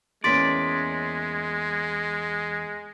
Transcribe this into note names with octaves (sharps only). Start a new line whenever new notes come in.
E2 G#3 A#3 C#4 D5 C6 B6